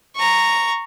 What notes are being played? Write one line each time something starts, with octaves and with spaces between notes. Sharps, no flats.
A#5 C#6